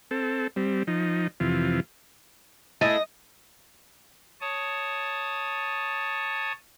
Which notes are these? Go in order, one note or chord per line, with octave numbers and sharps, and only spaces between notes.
C4 A4
G3 C4
F3 D#4
F2 C3 E3 F4
A3 E4 G#4 D#5
C#5 A5 D#6